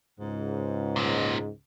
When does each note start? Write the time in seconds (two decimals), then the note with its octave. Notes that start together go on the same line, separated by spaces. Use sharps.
0.20 C#2 G#2
0.96 A#2 D#4